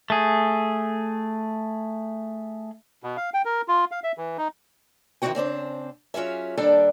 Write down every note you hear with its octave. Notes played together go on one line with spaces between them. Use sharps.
A3 G#4
B2
F5
G5
A#4
F4
F5
E5
E3
D#4
D#3 E3 F#3 C4 F#4 G5
C#3 C4 D4 C5
F#3 C#4 F4 G#4 E5
D#2 G3 D4 A4 D5 G5